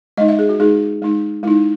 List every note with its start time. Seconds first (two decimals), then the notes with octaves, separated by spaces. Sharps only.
0.17 G#3 D#4 D#5
0.28 E5
0.39 G#4
0.49 F#4
0.60 G#3 D#4 G#4
1.02 G#3 D#4
1.43 G#3 D#4 E4